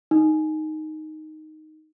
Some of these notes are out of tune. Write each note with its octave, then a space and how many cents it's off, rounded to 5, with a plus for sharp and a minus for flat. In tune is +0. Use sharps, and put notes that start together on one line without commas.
D#4 +0